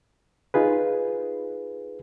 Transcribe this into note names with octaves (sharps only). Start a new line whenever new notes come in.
D#4 F4 G#4 B4